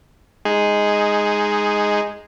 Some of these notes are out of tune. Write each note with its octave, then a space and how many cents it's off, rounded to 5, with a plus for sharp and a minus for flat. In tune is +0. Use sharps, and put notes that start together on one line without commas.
G#3 +0 D#4 +0 G#4 +0